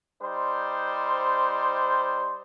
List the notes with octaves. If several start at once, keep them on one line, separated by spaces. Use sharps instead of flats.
G3 D#4 C5